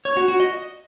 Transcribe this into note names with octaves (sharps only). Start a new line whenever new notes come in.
C#5
F#4
F#4
D#5